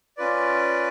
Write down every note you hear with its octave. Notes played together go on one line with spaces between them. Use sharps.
C#4 F4 B4 D5